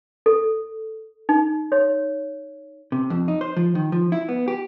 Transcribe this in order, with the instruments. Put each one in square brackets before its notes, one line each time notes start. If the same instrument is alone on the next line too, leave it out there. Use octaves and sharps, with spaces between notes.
[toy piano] A4
D#4
C#5
[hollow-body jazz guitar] C3
F2
D#4
C5
F3
D#3
F3
E4
B3
G4